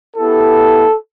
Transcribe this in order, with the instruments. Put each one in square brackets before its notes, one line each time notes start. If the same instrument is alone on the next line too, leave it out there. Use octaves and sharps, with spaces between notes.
[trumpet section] B3 E4 G4 A4